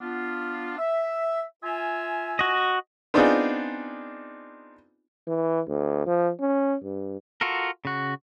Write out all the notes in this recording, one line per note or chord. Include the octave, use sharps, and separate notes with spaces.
B3 D4 F4
E5
F4 E5 G#5
F#4 D#5
B3 C4 D4 D#4 F4 G#4
E3
D2
F3
C#4
G2
F4 F#4 A4 A#4
C#3 F#4